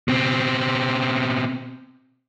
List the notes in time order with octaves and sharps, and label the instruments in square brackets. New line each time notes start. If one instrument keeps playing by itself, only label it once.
[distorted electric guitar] B2 C4